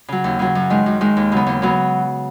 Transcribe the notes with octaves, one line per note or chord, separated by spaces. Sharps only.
C#3 F#3
D#2
C#3 F#3
F#2
D#3 G#3
F#2
D#3 G#3
D#2
C#3 F#3 B3
D#2
C#3 F#3 B3